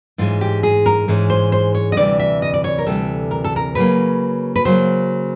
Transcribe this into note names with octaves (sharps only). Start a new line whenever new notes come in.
G#2 E3 G#3 C#4 F4
G4
G#4
A#4
G#2 E3 G#3 C#4
C5
C5
C#5
D#5
D2 C3 E3 G3 D5
E5
D#5
D5
C#5
A#4
D2 C3 E3 G3 A4
A#4
A4
A#4
C#3 F#3 A#3 B4
B4
C#3 F#3 A#3 C5